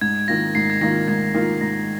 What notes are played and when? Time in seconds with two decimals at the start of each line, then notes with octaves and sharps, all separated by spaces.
0.01 G#2 G#6
0.28 D#3 A#3 F4 A#6
0.55 G#2 C7
0.70 G#6
0.81 D#3 A#3 F4 A#6
1.08 G#2 G#6
1.34 D#3 A#3 F4
1.61 G#2 A#6